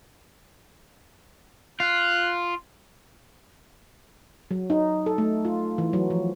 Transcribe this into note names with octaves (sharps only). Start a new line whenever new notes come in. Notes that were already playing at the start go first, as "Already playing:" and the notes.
F4 F#6
F#3
D#4
A4
A3
F4
E3
F#3
F3